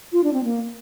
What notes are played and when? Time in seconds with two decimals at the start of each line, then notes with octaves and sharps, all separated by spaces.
0.13 F4
0.24 D4
0.33 C4
0.44 A#3